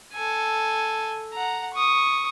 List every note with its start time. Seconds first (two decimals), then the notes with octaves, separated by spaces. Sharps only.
0.13 A4 G#5
1.33 F#5 A#5
1.74 C#6 D#6